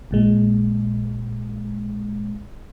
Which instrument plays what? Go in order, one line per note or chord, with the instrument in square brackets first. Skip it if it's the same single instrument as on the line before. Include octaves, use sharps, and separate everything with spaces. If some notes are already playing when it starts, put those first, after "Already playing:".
[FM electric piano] A#1 A#2 G#3